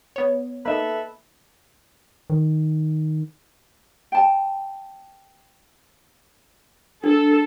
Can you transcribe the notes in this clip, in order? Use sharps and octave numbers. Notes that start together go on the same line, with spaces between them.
B3 C#5
A#3 D#4 A4 B4 E5
D#3
G5 A5
D4 A4